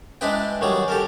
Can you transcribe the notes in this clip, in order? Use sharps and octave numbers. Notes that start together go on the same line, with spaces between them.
G#3 D4 E4 B4 D#5 G5
D#3 F#3 G3 G#4
G4 A4 A#4